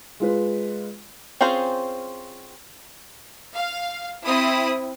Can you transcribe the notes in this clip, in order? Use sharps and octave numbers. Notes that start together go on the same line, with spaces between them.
G#3 F4 B4
C4 C#4 F4 G#4 C5
F5
C4 E4 D#6